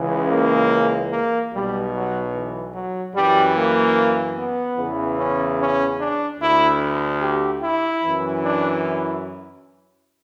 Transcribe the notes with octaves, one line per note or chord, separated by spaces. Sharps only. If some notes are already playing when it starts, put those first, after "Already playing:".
Already playing: C#2 C#3 E3
A#3
A#3
B1 B2 G3
F#3
E3
F#3
F#2 E3 G3
A#3
B3
E2 C#3 E3
C#4
C#4
D4
D2 D3 E4
G4
E4
F#2 E3
D4
E4